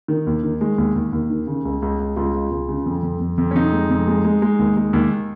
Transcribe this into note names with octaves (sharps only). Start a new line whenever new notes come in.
D#3
D#2
D#3
G#3
D#2
D#2
D#2
D#3
C#3
C#2
C#2
C#2
C#2 F4
C#2
C#2
C#3
F2
F2
F2
F2
C#4
F2 D#4
G#3
F2
G#3
G#3
G#3
D#2
G#3
D#2